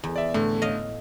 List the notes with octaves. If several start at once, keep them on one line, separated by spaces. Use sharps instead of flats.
E2
D5 E5
A2 D3 A3
D#5 F5